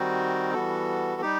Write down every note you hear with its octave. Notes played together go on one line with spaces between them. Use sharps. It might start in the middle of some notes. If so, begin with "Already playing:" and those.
Already playing: D#3 G3 C4 D#4 F#4
E3 G3 B3 F#4 A4
G3 D#4 G4